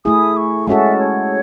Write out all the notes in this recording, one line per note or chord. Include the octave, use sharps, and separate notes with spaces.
A3 E4 G#4 D#6
C#6
G#3 C#4 F#4 A4 E5
C#5